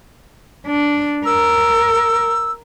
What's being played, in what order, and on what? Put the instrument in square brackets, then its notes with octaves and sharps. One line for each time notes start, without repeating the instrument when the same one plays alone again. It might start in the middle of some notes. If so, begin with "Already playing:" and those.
[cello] D4
[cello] A#4 [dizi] E6